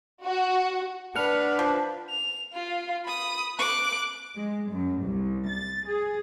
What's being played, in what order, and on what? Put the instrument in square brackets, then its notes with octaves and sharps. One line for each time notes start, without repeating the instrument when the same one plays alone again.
[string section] F#4
[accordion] D4 [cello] B4 [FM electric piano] F#5 F6
[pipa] F3
[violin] F7
F4
B5 D#6
D6 F#6
[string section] G#3
F#2
C2
A6
G#4